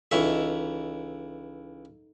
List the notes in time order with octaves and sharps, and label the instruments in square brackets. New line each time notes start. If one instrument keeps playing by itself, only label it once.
[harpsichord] C#2 E3 E5 [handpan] D#4 A4